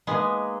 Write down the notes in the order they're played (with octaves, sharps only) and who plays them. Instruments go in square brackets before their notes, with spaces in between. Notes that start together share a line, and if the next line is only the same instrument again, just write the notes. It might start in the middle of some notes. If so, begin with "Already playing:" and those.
[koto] G#3 B3 [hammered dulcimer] A#3 D#4 G#4 B4